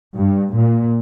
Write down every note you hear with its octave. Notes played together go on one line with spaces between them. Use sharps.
G2
A#2